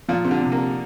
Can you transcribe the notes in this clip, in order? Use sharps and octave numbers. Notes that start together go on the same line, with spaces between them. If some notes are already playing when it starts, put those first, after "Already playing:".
A#2 F3
C3
D3
C3
A#3